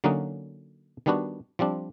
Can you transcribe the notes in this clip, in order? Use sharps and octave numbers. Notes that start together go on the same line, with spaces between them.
D3 F#3 A#3 C#4 D#4 F#4
D#3 G3 B3 D4 F#4
F3 G3 C4 D4